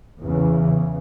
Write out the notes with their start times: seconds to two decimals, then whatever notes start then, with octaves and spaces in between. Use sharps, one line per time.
0.20 E2 C#3 E3